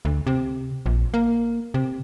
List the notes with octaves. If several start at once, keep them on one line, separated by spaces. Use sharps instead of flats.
D2
C3
A#1
A#3
C3